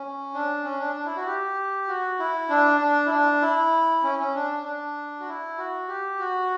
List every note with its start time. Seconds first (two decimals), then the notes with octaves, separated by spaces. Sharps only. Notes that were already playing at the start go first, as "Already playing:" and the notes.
Already playing: C#4
0.34 D4
0.64 C#4
0.80 D4
0.96 D4
1.05 E4
1.16 F#4
1.26 G4
1.88 F#4
2.19 E4
2.49 D4
2.81 D4
3.06 E4
3.11 D4
3.42 E4
4.03 C#4
4.19 C#4
4.35 D4
4.65 D4
5.20 F#4
5.27 E4
5.58 F#4
5.88 G4
6.20 F#4